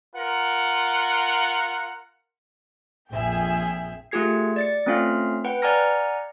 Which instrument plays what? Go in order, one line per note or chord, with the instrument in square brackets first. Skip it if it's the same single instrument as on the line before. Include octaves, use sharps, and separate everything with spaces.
[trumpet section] F4 A#4 F#5
[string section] A#1 F2 G#4 E5 G5
[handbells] A3 F4 G4 G#4 G#6 C7
D5 A6 C#7
A3 C4 C#4 F4 F5 F6
B4 F#5 G5
D5 F#5 G#5 A#5 F6 A#6